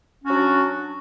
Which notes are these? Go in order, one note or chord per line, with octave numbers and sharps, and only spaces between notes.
F#3 C#4 D4 F#4